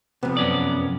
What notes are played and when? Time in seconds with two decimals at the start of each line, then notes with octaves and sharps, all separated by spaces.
0.23 F2 C3 B3
0.37 F#2 C#4 D5